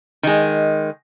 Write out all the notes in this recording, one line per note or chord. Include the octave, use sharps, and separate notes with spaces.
D#3 G#3